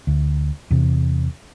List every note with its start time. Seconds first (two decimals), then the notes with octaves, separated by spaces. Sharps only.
0.07 D2
0.71 E2 C3